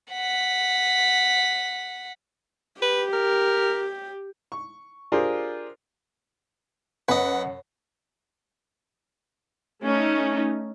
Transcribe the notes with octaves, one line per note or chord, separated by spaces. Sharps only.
F#5 B6
G4 B4
A#4
C#6
D4 F4 G4 G#4 A#4 C5
F#2 B4 D#5 F#5
A3 C#4 D#4